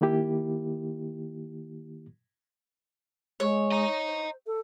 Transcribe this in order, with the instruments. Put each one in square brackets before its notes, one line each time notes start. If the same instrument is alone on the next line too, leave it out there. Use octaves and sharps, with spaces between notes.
[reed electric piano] D#3 A#3 E4 G4
[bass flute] G#3 [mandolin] C#5
[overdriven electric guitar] D#5 A#5
[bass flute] C5
A4